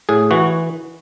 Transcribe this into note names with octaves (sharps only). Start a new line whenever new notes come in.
A2 G#4
E3 F#4